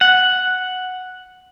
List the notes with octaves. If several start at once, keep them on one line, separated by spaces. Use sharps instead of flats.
F#5